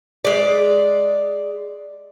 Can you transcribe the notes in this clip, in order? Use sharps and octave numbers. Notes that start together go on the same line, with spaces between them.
G#3 D5